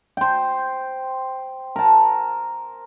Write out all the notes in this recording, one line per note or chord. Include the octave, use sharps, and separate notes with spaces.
C5 G5
A#4 A5